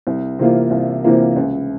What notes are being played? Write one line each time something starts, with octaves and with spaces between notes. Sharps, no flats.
C2
C3 E3 A#3 F4
C2
C3 E3 A#3 F4
C#2